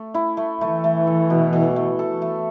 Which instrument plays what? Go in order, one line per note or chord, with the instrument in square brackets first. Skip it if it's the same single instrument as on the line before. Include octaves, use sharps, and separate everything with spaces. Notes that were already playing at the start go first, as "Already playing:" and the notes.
Already playing: [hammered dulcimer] A3
E4
A3
[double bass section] E3 [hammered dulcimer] A3
[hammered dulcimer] A3
A4
B2
B2
A3
A4
A3